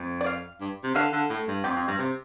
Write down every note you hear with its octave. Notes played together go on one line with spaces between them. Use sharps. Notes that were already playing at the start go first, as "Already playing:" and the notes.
Already playing: F2
D5
F5
G2
C3
D3 F5
D3
A2
G2
F2 G4
F2
G2
C3